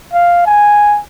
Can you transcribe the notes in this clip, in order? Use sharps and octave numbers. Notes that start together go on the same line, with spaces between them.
F5
G#5